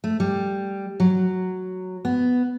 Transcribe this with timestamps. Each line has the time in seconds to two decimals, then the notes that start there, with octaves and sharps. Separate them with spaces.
0.04 A3
0.20 G3
1.00 F#3
2.05 B3